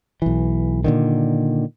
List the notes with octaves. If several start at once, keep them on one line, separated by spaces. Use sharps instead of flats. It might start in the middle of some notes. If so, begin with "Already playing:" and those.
B1 E3
A#2 D3 D#3